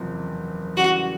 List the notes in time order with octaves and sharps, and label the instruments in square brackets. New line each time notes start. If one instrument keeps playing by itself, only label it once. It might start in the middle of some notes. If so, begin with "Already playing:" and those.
Already playing: [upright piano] F#1 E2 C3 F3
[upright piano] C#3 E3 G3 [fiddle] F#4